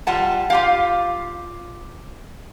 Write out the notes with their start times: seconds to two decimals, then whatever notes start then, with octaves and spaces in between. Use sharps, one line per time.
0.07 G3 F4 F#5 A5
0.50 F4 G4 F5